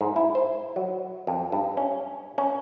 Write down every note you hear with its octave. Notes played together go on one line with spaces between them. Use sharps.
G#2
E4
C5
F#3
F2
G2
C#4
C#4